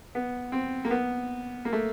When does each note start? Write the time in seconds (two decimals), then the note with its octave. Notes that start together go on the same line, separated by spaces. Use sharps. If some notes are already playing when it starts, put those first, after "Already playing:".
0.15 B3
0.52 C4
0.85 A#3
0.90 B3
1.65 A#3
1.73 A3